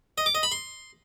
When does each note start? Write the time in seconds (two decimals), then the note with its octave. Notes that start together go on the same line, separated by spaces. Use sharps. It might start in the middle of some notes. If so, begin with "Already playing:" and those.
0.18 D#5
0.26 D6
0.35 D#5
0.43 B5
0.52 C6